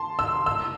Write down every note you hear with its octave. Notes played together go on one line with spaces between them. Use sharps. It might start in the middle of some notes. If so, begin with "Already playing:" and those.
Already playing: A5 C6
E6
E6